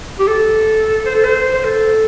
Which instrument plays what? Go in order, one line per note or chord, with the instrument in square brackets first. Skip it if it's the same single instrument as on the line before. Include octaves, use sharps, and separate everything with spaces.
[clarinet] G4
A4
C5
A4
C5
C5
A4